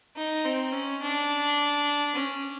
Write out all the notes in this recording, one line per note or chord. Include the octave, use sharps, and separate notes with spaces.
D#4
C4
C#4
D4
C#4